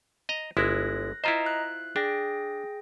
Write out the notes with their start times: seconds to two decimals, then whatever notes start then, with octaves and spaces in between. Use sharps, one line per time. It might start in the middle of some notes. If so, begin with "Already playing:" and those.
0.29 D#5 A#5
0.57 G1 G#3 E4 F#6 A#6
1.24 E4 F4 C5 D#5 A#5
1.46 F#6
1.96 D4 G#4 G5 A#6